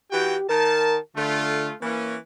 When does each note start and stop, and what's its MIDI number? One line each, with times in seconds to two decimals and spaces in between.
0.12 0.36 52
0.12 0.36 66
0.12 0.48 67
0.12 0.36 79
0.49 0.96 51
0.49 0.99 70
0.49 0.96 81
1.16 1.69 50
1.16 1.73 57
1.16 1.73 65
1.82 2.15 52
1.82 2.17 58
1.82 2.15 61